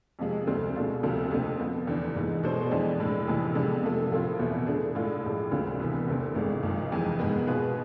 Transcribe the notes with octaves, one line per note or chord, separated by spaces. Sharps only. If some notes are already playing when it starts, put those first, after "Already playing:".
F2 C3 F3 G#3
D2 D3 A3 C4
B2 G#3 D4 F4
D2 C3 F3 A3 C4
F2 D3 A3 C4
D3 F3 B3
F1 E2 D3
G#2 E3 G#3
B2 G#3 D4 A4 C5
F2 E3 G#3 D4
A2 G#3 D4
F1 F2 C3 E3
F2 D3 G#3 B3
C3 F3 A3
A2 F3 A3 C4 F4
E2 B2 B3 E4
D3 A3 D4 G#4
A2 G#3 D4 F4 G#4
A1 A2 F3 G#3
D2 D3 G#3 C4 F4
C2 C3 E3 B3
E2 D3 A3 C4
G#1 G#2 G#3
G#1 G#2 F3
F1 F2 E3 G#3
G#2 G#3 B3
B2 B3 F4 G#4 B4